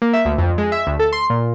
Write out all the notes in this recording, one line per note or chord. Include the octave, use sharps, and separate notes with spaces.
A#3
E5
D2
F2
G#3
E5
D2
A4
C6
A#2